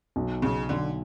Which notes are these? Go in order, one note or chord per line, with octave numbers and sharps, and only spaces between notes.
B1
B1 C#3
B1 D3